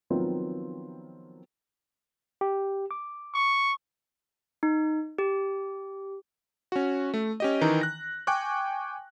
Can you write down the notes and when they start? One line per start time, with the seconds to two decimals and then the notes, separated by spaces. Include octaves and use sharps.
0.10 D#3 F3 F#3 B3 C4 F4
2.41 G4
2.91 D6
3.35 C#6
4.63 D#4
5.18 G4
6.72 C#4 F#4
7.14 A3
7.40 C#4 G4 D#5
7.61 D#3 E3 D#4 A#5
7.81 F#6 A#6
8.27 G5 G#5 C#6 D6 F#6